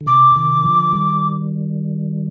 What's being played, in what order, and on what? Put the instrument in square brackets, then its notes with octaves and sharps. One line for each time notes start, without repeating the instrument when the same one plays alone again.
[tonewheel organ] D3
[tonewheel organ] C3 [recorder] D6
[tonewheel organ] C3 D#3
D3 F3
D#3 G3